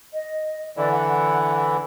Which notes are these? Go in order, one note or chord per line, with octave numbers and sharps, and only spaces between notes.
D#5
D3 E3 E4 D5
F#5